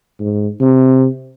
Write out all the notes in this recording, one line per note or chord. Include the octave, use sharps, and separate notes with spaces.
G#2
C3